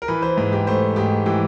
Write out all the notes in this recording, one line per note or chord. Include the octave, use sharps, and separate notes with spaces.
A#4
E3 B4
C5
G#2 B4
G4
A3 C5
G#2 G4
E3 G4